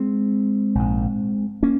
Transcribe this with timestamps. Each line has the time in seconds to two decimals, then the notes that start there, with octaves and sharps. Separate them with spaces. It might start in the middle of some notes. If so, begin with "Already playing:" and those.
Already playing: G#3 C4
0.75 A#1 G#2
1.63 A#3 C#4